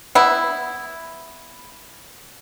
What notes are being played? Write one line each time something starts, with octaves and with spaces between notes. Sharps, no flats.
B3 E4